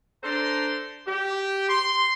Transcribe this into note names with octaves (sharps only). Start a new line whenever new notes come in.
D4 A4 C5 A#5 C6
G4
C6